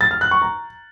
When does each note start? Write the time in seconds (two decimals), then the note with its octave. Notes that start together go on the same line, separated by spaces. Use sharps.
0.01 A6
0.11 F6
0.21 F#6
0.31 C#6
0.42 A#5